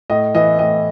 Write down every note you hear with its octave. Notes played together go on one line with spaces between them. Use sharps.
A2 D#5
E3 D#5
A2 D#5